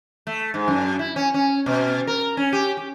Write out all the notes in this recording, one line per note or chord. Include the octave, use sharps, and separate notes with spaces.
A3
G#2
F#2
E4
C#4
C#4
B2
A#4
C#4
G4
G4